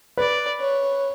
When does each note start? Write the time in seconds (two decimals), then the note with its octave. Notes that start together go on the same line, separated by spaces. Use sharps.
0.17 B4 D5
0.60 C#5